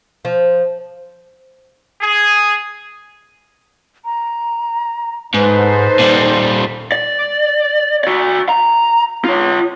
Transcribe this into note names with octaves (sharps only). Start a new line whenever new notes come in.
F3
G#4
A#5
G#2 D#4 A4 B4 C5
A#2 G3
D5
F#4 D5
A#5
F4 C#5